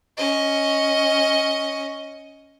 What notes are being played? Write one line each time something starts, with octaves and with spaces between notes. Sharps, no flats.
C#4 D#5